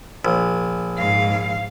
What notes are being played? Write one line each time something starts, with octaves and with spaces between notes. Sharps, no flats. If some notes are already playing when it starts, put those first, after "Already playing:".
A#1
G#2 F5